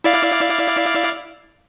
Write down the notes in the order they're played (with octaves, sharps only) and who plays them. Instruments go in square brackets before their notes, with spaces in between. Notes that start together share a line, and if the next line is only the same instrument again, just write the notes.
[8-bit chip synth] E4 D5 F5